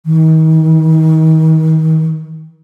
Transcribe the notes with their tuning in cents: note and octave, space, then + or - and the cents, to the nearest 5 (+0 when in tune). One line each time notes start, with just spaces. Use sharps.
D#3 +35